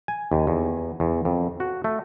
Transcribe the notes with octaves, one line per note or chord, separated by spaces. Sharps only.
G#5
D#2
E2
E2
F2
F#4
A3